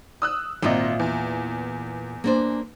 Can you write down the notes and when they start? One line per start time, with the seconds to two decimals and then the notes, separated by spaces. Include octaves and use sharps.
0.22 D#6 E6 F#6
0.63 G#1 A#2 C4 F4 D#5 E5
0.99 E2
2.24 A#3 D4 C5